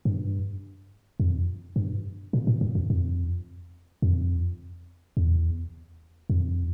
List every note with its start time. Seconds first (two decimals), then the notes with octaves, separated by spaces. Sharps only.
0.05 G2
1.20 F2
1.76 G2
2.33 A#2
2.47 A2
2.61 G2
2.75 F2
2.90 F2
4.02 F2
5.17 E2
6.30 F2